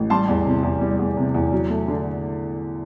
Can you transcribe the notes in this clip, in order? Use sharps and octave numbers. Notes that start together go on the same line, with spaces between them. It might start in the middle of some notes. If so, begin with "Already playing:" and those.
Already playing: A1
G3 A5 C6
E2
C3
E2
G3
E2
C3
E2
F#3
A3
D3